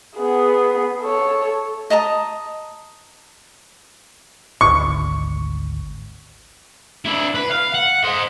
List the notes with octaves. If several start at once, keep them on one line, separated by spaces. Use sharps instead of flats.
B3 G#4
A4 C#5
D#5 A5 A#5 D#6
G#1 D2 C#6
D4 E4
B4
F5
F#5
C5 D#5